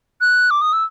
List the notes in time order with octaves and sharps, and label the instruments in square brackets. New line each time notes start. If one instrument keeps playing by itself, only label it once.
[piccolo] F#6
D6
D#6
E6